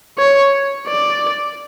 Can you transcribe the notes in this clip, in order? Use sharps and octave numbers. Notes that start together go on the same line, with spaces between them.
C#5
D5